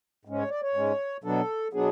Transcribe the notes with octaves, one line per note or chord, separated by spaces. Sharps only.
G#2 G#3 C#4
C#5
D5
C#5
G#2 G#3 C#4
B2 F#3 B3 D4 A4
B2 F#3 B3 D4 G#4